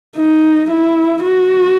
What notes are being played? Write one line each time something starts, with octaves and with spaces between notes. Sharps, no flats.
D#4
E4
F#4